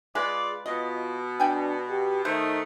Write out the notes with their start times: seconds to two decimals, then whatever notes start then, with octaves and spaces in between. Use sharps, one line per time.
0.15 G#3 F4 G#4 B4 D5
0.66 B2 F4 D#5
1.40 D4 D5 G5 G#5
1.90 G4
2.25 D#3 A3 D#4 C5